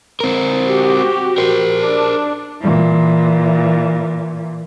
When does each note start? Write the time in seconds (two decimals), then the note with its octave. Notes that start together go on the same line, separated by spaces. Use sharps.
0.20 C4 A#4
0.67 F#4 G4
1.38 A#4 C5
1.80 D4
2.61 A#2 E3